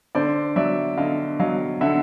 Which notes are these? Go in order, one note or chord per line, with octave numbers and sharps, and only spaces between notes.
D3 C5 D5
F#3 D5 E5
D3 D#5 F5
F#3 D#5 F5
D3 E5 F#5